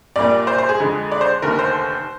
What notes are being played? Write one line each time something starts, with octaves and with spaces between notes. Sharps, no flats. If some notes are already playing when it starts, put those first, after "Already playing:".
A#1 A#2 G3 A#3 D5
C5
C5
G#4
F2 D3 G#3
D5
C5
F1 D#2 D3 A#4
C5